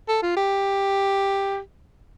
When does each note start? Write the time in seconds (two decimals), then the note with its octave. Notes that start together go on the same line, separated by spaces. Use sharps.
0.09 A4
0.23 F4
0.37 G4